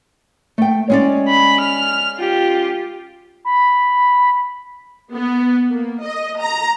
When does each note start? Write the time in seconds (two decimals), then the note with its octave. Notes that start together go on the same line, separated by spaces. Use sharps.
0.58 A3 G5
0.90 G#3 C#4 D5
1.28 B5
1.60 F6
2.17 F4 G4
3.45 B5
5.12 B3
5.70 A#3
6.03 D#5
6.40 A#5